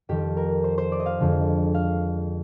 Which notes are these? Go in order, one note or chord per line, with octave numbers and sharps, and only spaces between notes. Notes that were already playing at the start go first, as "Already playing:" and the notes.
F2 D#3 G3 G4
A#4
C5
C5
D5
D#5
F5
F2 D3 G#3
F5